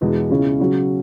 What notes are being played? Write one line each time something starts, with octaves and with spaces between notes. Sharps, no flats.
E1 E2 B2 G#3
C#2 C#3 G#3 C#4 E4
C#3 F#3 C#4 F#4